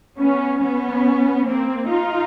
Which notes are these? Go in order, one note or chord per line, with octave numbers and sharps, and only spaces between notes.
B3 C#4
B3 C#4
A#3 C4
D#4 F4